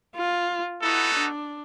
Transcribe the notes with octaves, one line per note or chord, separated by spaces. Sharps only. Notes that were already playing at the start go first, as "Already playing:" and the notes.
F4
B3 D#4 E4 F#4 A4
D4